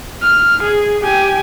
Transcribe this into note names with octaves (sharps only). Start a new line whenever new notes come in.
F6
G#4
G4 G#5